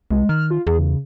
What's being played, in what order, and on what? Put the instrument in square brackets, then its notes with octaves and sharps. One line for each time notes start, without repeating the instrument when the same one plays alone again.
[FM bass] C2 [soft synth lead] G#3
[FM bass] D#3 [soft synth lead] F6
[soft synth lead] F4
[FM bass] E2 [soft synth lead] G#4
[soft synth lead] C#3